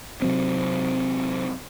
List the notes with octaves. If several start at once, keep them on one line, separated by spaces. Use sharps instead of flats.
C3 F#3 C4